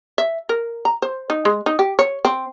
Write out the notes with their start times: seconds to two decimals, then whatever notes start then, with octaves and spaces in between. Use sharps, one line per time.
0.18 E5
0.49 A#4
0.85 A#5
1.02 C5
1.30 D#4
1.45 G#3
1.66 D#4
1.79 G4
1.99 C#5
2.25 C4